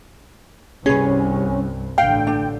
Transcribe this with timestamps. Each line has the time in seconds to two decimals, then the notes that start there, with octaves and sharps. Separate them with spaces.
0.86 C2 G2 C#4 G#4 B4
1.98 A1 D3 F5 G5
2.27 D4